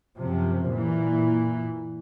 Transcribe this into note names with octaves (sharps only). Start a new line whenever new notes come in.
F#2 C3 F3
A#2 E3